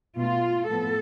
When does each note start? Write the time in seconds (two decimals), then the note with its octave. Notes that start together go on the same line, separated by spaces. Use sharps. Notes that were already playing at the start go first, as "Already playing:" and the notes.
0.18 B2 A3 F4
0.68 A2 F3 B3 A4